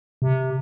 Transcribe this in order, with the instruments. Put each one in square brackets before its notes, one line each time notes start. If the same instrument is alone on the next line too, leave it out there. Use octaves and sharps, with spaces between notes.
[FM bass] C3